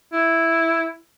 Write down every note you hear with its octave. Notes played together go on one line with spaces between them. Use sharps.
E4